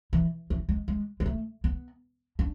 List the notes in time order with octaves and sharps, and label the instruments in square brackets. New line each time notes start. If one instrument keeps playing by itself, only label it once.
[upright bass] E3
E3
G#3
G#3
G#3
A3
B3
D4